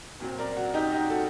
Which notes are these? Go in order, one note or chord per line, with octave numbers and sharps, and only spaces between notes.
A#2 F#3 C4
A#4 D5
F#4
D#4 G4
D#4 G4
F#4 A4